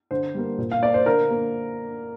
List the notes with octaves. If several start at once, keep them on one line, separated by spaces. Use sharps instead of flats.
D3 C5
G3 A#3
A#2
F5
A#3 D5
C5
D3 A#4
A#3